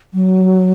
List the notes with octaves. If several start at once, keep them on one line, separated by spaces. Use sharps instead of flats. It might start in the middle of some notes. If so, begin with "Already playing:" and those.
F#3